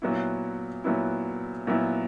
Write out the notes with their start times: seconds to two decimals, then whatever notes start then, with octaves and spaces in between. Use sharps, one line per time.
0.02 A#2 F#3 B3 E4
0.84 A#2 F#3 B3 E4
1.67 A#2 F#3 B3 E4